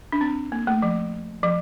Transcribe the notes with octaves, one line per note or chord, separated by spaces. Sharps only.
D4
C4
A#3
A3
F3
F3